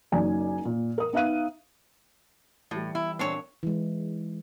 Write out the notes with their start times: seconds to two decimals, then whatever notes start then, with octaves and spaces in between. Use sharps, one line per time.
0.12 F#1 F#2 D#4 D5 G#5
0.65 A#2
0.98 A#4 D#6
1.13 B3 D#4 E5 F5 F#6 D#7
2.71 A2 E3 G3
2.95 E4
3.19 A#2 C4 D4 C#5
3.63 E3 G#3